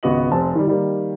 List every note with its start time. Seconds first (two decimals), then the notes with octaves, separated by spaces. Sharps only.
0.03 G#1 C#2 B3 F#4 D#5 F#7
0.31 F1 C4 A5
0.55 D#3 G3
0.67 D#3 G3 A#3